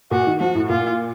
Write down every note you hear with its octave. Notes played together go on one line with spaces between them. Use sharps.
A#2 F#4
D#3
F3 F#4
A2
A#2 F4